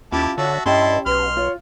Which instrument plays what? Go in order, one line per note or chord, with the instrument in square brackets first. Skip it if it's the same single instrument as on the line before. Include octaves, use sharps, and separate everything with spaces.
[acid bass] D#2 [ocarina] C#4 [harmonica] E4 G4 A5 [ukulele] F4
[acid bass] D3 [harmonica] F#4 E5 A5 [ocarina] C#5
[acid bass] G2 [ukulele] C#4 G4 [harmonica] E4 A5 C6 [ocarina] D#5
[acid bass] B1 [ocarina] B4 [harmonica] C6 F6
[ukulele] F4 [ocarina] C#5